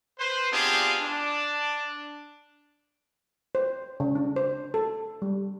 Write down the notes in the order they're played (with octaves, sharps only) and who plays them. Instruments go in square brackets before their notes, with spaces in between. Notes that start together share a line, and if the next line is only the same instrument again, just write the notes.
[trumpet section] B4 C5
B3 C4 D4 F4 G4 G#4
D4
[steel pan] C5
C#3
D4
C5
A4
G3